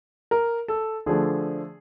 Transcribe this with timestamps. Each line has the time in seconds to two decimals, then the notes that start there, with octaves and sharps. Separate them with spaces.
0.31 A#4
0.68 A4
1.06 D3 F3 A3 D4 G#4